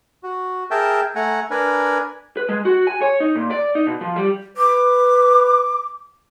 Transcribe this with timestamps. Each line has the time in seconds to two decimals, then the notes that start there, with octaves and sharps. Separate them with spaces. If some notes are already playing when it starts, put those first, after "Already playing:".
0.23 F#4
0.71 G#4 A#4 E5 G5 A5
1.15 A3 F#5 G#5 A#5
1.51 D4 A#4 B4 G#5
2.37 B4
2.49 G#3
2.65 F#4
2.87 G#5
3.02 C#5
3.20 D#4
3.35 A#2
3.50 D5
3.75 D#4
3.87 B2
4.01 F3
4.16 G3
4.57 B4 D6